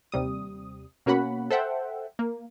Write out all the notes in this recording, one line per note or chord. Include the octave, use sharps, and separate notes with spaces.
D#2 C3 G3 D#6
B2 A#3 C#4 F#4 F#5 B5
A4 C5 E5 F#5 G5
A#3